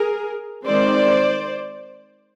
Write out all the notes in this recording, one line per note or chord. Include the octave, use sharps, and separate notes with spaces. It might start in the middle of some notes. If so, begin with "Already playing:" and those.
Already playing: G#4 A#4
D#3 G#3 C4 C5 D5